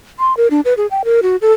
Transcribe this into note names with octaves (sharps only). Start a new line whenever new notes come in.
C6
A#4
D4
B4
G#4
G5
A#4
F#4
A4